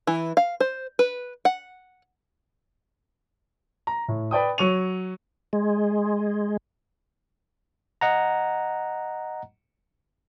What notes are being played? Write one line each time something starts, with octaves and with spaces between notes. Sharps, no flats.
E3
F5
C5
B4
F#5
A#5
A2
B4 D5 G5 D#6
F#3 C#6 D#7 F7
G#3
D#5 F#5 A#5